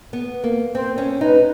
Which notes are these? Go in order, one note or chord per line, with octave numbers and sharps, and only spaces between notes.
B3
A#3
C4 C5
C#4
D#4 B4